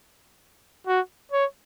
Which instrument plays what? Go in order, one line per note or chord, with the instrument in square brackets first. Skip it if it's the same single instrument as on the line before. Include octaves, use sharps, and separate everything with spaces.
[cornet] F#4
C#5